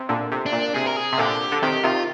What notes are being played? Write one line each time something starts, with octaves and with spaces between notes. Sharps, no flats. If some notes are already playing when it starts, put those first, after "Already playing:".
Already playing: C3
A#2 D3
C3
D4
A#2
C3 G#4
A#4
G#4
C3
A#2 D3 G4
D3
C3 D#3 G4
C3 D#3 F4